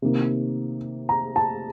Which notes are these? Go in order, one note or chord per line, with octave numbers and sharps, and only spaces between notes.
C3 D#3 A#3
A#5
A5